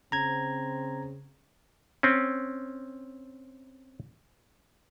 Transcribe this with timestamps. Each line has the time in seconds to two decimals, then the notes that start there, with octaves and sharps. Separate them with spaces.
0.12 C#3 C4 A#5 G#6
2.03 C4 C#4